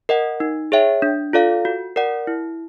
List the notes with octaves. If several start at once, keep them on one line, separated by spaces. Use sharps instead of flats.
A#4 D#5 F#5
D#4
G#4 C#5 E5 G5
D4
F4 A4 D5 F5
F#4
A#4 D5 F#5
E4